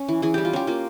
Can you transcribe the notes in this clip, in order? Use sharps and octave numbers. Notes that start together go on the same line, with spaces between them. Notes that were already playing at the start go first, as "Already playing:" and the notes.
Already playing: C#4
E3
E3 G#4
G3 G4
F4
C#4 G4
A#3 F4